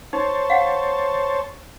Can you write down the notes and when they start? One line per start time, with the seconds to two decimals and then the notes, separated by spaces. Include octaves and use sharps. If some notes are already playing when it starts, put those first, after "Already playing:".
0.13 D#4 C5 C#5 A5
0.50 F5 F#5